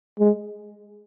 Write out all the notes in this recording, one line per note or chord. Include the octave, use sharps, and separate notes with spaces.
G#3